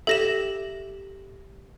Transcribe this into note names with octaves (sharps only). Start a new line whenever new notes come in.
G4 A4 E5 A#6 E7